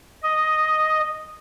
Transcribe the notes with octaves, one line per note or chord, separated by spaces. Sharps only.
D#5